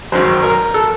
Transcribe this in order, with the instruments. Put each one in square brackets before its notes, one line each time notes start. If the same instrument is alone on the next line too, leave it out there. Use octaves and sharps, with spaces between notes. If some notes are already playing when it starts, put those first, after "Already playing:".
[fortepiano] G#1 F#2 D#3 F#3 C5
A#4
A4